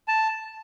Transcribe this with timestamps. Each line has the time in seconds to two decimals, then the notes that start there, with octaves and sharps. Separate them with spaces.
0.08 A5